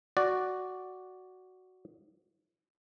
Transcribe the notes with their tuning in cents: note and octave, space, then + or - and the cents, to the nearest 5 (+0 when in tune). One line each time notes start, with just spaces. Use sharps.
F#4 +0 D5 +0